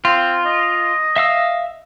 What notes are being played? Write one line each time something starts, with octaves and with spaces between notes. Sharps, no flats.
C4 F4
D#5
E5 F5 E6